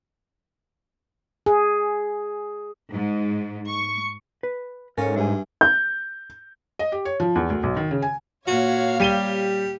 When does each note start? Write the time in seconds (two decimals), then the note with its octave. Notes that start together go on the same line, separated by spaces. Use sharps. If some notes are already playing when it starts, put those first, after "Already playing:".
1.46 G#4
2.91 G#2
3.68 C#6
4.43 B4
4.98 G#2 C#4 A4 A#4 C#5 F5
5.16 G2 G3 E5 G#5
5.61 G6
6.79 D#5
6.92 G4
7.05 C#5
7.20 F3
7.36 E2
7.50 D2
7.63 B1
7.77 D#3
7.91 C#3
8.02 G#5
8.47 A#2 F#4 C#5 F5
9.00 G3 G4 D#7 G7